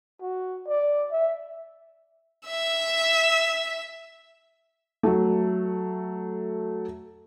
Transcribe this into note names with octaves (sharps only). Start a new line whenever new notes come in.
F#4
D5
E5
E5 E6
F#3 A3